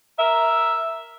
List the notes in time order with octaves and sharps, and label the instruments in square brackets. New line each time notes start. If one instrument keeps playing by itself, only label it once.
[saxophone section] A#4 E5